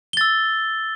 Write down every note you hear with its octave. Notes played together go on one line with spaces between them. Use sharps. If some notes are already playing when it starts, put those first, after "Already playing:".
E6 A6 G7